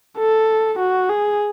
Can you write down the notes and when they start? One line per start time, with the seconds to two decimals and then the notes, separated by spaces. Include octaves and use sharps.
0.18 A4
0.79 F#4
1.10 G#4